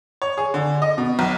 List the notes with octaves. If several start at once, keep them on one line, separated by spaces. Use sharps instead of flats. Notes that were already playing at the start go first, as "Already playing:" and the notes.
C#5
G#4
D3
D#5
B2
B1